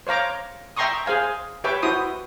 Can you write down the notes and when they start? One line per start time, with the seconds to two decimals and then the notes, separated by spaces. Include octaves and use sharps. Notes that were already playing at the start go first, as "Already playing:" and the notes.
0.07 C5 C#5 F5 A#5 D6
0.76 E5 G5 A#5 C6 C#6 D#6
1.06 G#4 C5 F5 G#5
1.64 G4 B4 C#5 E5 G5 D6
1.82 E4 F#4 C5 D#6